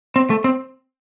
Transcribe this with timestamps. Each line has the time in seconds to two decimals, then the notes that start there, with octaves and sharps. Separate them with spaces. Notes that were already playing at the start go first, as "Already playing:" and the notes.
0.16 C4
0.30 A3
0.44 C4